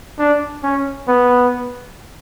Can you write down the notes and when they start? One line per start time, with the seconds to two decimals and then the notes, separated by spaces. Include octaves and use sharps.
0.19 D4
0.63 C#4
1.08 B3